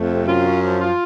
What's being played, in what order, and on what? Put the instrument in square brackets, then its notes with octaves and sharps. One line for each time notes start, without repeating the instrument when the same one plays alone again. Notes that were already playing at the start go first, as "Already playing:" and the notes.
Already playing: [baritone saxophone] F2 [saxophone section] A3
[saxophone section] C3
[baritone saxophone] F#2 [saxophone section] F4
[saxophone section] C#4
F3
F4